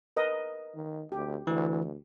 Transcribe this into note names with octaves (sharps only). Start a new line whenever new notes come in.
A#4 B4 D#5
D#3
D2 G4
D2 E3